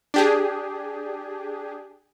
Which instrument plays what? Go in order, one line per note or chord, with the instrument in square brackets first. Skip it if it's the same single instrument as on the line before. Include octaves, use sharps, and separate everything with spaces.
[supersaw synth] D4 G4 G#4